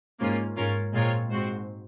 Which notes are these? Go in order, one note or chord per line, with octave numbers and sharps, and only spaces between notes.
G#2 A#3 C#4 F4
G#2 C#4 F4 A#4
A#2 G#3 C4 F4 A#4 C#5
G#2 C4 F#4 C5